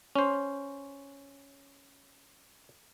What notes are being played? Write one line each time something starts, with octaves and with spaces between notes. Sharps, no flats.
C#4 C5